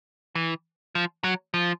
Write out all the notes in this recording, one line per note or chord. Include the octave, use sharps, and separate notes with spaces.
E3
F3
F#3
F3